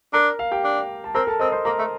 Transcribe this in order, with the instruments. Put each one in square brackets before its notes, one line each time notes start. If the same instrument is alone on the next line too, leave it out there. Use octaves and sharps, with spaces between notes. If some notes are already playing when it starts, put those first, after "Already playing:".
[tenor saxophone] D4 [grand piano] A#4 A#5
[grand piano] F5
G4 G5
[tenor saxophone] D4
[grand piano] A5
[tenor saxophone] C4 [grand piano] A#4 A#5
[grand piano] A4 A5
[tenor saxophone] C4 [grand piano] D#5 D#6
[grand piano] C5 C6
[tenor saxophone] A#3 [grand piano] A#4 A#5
[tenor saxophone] A3